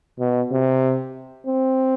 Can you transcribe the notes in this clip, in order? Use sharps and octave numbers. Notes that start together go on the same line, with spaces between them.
B2
C3
C4